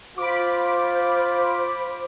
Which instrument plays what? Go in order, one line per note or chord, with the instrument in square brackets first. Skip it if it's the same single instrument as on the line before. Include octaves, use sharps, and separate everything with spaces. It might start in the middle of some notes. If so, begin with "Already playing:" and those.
[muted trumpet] F4 [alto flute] C5 [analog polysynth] B5 D6